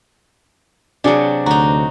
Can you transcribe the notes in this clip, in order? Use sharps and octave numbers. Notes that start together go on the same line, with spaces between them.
C3 F#3 D4 G#4
D2 D#4 F#4 A#5